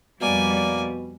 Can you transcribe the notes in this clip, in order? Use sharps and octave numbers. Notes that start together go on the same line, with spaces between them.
F2 B2 G3 A#3 D5 G#5